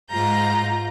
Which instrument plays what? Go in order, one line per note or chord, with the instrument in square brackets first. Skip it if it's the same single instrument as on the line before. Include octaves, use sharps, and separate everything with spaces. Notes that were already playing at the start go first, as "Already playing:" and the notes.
[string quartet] G#2 F4 A#5 G6 A#6